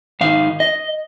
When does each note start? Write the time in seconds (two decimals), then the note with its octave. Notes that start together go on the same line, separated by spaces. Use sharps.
0.21 G#2 D#3 D#4 F5
0.60 D#5